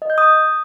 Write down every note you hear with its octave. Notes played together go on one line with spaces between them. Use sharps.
D#5
G6
D#6